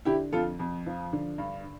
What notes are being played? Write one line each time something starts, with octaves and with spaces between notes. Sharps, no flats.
D3 E4 G4
F2 F4 A4
F2
F3
D3
G2